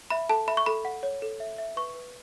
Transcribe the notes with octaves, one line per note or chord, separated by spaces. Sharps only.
E5 B5
A4 A5
E5 B5
C#6
A4 B5
F#5
C#5
A4
E5
E5
B4 C#6
B4